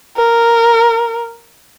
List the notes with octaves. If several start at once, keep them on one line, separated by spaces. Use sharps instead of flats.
A#4